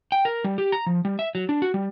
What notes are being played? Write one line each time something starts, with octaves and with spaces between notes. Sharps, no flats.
G5
A#4
G3
G4
A#5
F3
G3
E5
F#3
D4
F#4
G3